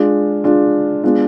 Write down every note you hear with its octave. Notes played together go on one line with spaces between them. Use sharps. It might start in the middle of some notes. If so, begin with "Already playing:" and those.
Already playing: G#3 D4 F4
G#3 D4 F4
G#3 B3 D4 F4